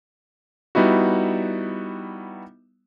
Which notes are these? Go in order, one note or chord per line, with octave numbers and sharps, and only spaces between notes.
G3 B3 D#4 E4 F#4